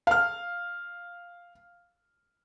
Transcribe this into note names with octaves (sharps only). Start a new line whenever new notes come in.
F5 F6